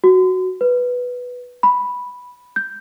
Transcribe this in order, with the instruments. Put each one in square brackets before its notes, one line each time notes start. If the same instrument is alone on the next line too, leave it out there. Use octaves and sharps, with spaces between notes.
[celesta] F#4
B4
B5
G6